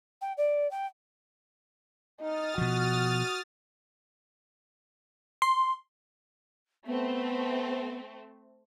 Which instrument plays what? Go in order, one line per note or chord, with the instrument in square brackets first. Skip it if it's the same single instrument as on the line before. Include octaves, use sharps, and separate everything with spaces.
[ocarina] G5
D5
G5
[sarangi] D#4 [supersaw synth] D#6 F6 A6
[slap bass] B2 F3 [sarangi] F#4
[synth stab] C6
[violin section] A3 C4 [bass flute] B3